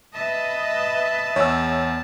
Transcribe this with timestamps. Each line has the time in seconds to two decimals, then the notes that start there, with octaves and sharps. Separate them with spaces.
0.14 B4 D#5 E5 A5
1.36 E2 C#5 E6